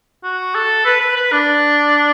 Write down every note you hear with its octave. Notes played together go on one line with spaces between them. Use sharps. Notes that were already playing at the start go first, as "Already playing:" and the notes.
F#4
A4
B4
B4
B4
D4